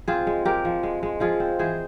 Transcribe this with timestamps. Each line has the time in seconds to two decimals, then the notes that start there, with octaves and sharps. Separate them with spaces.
0.08 C4 F4 G#4
0.27 G#3
0.45 G#3 G4 A#4
0.65 F3
0.83 G#3
1.03 G#3
1.20 F3 F4 G#4
1.40 C4
1.59 E3 G#4 C5